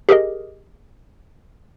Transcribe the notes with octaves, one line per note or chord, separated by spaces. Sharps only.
G4 G#4 A#4 D#5